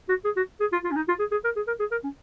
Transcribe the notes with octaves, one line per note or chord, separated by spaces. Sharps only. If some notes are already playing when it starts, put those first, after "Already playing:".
F#4
G#4
F#4
G#4
F4
F4
C#4
D#4
F4
G#4
G#4
A#4
G#4
A#4
G#4
A#4
C#4